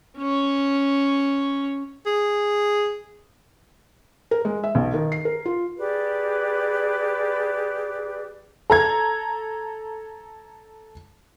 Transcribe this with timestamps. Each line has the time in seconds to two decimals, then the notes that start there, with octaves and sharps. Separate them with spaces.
0.19 C#4 C#5
2.06 G#4
4.31 A#4
4.45 G#3
4.64 E5
4.75 B1
4.94 D#3
5.12 C7
5.25 A#4
5.45 F4
5.78 G4 G#4 B4 D5
8.70 A4 A#5 G#6